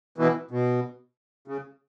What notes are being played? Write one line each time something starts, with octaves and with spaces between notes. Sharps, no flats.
B2 E3
B2
C#3